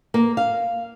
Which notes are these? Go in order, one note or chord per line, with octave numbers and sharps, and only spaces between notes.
A#3
F5